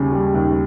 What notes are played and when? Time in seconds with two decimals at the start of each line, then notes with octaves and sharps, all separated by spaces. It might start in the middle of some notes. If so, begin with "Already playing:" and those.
Already playing: D#2 C#3 G3
0.12 G3
0.34 D#2